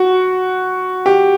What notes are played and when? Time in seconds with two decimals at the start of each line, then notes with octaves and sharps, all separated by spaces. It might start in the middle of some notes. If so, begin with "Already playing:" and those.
Already playing: F#4
1.06 G4